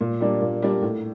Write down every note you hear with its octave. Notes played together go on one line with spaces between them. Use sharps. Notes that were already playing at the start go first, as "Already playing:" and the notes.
A#2
G3 A#3 D4
A#2
G3 A#3 D4
A2